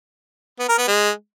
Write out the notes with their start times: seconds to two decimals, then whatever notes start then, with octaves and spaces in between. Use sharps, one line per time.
0.59 B3
0.69 A#4
0.78 B3
0.88 G#3